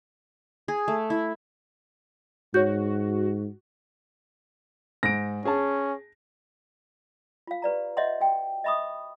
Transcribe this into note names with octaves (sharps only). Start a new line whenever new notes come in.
G#4
A3
E4
G#2 F#4 C#5 G6
G#2 A#6 D7
C#4 G#4 A5
F4 F5
G4 B4 D5 A#5
C#5 D#5 E5 F#5 C6
F#4 G5
D#5 E5 B5 C#6 D#6